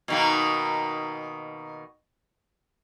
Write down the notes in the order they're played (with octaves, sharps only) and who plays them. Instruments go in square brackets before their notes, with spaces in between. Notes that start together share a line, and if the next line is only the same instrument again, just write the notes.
[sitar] B2 D#3 A#3